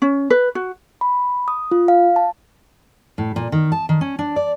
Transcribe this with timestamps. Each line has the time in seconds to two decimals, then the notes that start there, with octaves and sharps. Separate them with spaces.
0.02 C#4
0.30 B4
0.55 F#4
1.01 B5
1.48 D#6
1.71 F4
1.88 F5
2.16 A5
3.18 A2
3.36 A#2
3.52 D#3
3.72 A5
3.89 D#3
4.01 C#4
4.19 D4
4.36 D5